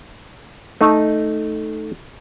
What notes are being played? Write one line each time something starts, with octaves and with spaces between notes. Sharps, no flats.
A3 D#4